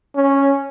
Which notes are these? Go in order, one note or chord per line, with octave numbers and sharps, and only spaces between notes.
C#4